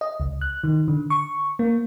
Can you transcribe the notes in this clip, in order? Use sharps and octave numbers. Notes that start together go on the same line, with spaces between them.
D#5
C#2
F#6
D#3
D3
C#6
A#3